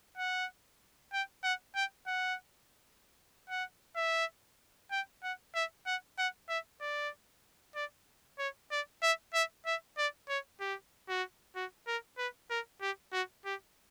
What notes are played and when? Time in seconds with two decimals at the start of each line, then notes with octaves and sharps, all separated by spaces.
0.17 F#5
1.13 G5
1.44 F#5
1.75 G5
2.07 F#5
3.50 F#5
3.96 E5
4.91 G5
5.23 F#5
5.55 E5
5.86 F#5
6.18 F#5
6.49 E5
6.81 D5
7.75 D5
8.39 C#5
8.71 D5
9.02 E5
9.34 E5
9.66 E5
9.98 D5
10.29 C#5
10.60 G4
11.08 F#4
11.56 F#4
11.87 A#4
12.18 B4
12.50 A#4
12.81 G4
13.13 F#4
13.45 G4